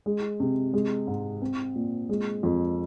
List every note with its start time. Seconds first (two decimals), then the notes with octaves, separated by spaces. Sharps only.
0.06 G#3
0.40 C3
0.74 G#3
1.07 G#2
1.42 C4
1.75 A#2
2.09 G#3
2.43 F2